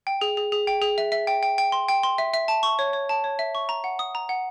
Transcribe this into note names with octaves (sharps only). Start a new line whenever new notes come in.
G5
G#4
G#4
G#4
G5
G#4
E5
E5
G5
G5
G5
C6
G5
C6
E5
E5
A5
C#6
C#5
C#5
A5
C#5
E5
C#6
A#5
F#5
D#6
A#5
F#5